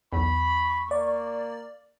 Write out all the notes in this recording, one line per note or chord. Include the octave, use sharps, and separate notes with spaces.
B1 E2 B5 C#6
A#3 D5